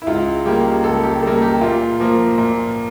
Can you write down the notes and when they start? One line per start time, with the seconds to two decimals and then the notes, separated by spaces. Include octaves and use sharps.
0.02 E4
0.07 C#2 F4
0.45 C#3 G3 A#3 G4
0.84 C#2 A4
1.03 G4
1.23 C#3 G3 A#3 A4
1.42 G4
1.61 A#2 F4
2.00 F3 A#3
2.38 A#2